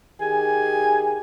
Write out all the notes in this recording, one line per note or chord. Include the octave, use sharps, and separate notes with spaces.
D#3 G4 G#4 G#5